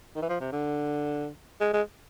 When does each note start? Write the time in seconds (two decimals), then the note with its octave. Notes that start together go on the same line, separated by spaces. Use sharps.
0.16 D#3
0.22 E3
0.29 F3
0.40 C3
0.52 D3
1.61 G#3
1.73 G#3